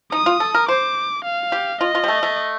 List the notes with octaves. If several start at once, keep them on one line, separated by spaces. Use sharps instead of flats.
D#4 D#6
F4
A4
A#4
C5 D6
F5
G4
F4 D#5
F4
G3
A3
A3